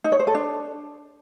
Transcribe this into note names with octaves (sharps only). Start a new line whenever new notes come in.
D#4
C#5
C5
A4
D4